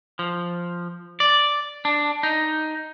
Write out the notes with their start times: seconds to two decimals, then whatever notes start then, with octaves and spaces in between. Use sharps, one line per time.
0.19 F3
1.20 D5
1.85 D4
2.23 D#4